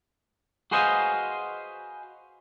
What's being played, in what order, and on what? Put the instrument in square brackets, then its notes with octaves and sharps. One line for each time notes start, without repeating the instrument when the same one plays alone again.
[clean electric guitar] F#4 G#4 B4 C5 D#5 F5